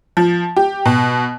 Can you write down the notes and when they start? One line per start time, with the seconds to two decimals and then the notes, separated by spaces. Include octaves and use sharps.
0.17 F3
0.56 G4
0.86 B2